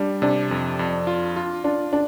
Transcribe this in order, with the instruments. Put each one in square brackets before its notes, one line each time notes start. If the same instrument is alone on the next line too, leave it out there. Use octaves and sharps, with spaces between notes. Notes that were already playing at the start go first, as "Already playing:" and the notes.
Already playing: [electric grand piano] G3 [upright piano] D4
[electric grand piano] C3 [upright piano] D4
[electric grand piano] F2
F2
F4
F4
[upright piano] D4 [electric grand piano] F4
[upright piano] D4